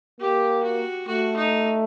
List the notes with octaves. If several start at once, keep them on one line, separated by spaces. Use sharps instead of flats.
A#3 G4
F#4
A3 F#4
D#4